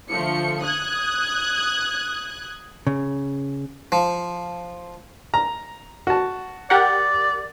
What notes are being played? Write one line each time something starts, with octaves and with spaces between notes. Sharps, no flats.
D3 F3 A3 C#7
D#6 F#6 G#6
C#3
F3
A#5
F#4 A5
G4 A#4 D5 F#5